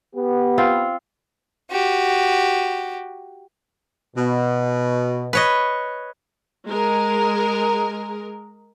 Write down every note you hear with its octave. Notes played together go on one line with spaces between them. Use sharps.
B3 G4
C4 F4
F#4 G4
B2
B4 C#5 D#5
G#3 A#4